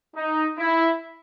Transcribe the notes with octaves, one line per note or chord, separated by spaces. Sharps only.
D#4
E4